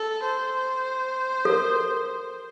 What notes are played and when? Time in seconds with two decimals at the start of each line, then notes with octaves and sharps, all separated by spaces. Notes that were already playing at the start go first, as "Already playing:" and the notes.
Already playing: A4
0.24 C5
1.45 A4
1.50 A#4